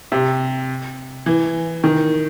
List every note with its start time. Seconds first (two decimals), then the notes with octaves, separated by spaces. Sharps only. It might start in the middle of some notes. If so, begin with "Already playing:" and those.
0.12 C3
1.26 E3
1.84 D#3